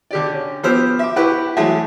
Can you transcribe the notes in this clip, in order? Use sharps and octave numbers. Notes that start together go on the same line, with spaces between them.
D3 G4 D5
C#4
F3 B3 G4 C5 E6 F6
E5 D6
E4 F#4 G4 B4
E3 F#3 G#3 A3 E5 F#5